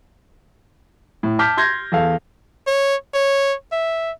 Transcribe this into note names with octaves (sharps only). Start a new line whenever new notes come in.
A2
A5 D6 F6 G6 B6
C6 G6 G#6 A#6
E2 A4 F5
C#5
C#5
E5